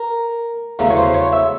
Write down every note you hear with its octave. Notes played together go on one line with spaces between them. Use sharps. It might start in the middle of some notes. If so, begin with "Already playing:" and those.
Already playing: A#4
E2 C#3 F#3 A3 C#4
C#5
C5
C#5
E5